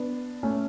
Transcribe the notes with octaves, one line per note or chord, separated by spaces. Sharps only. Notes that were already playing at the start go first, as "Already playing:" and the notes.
Already playing: B3 D4
A3 C#4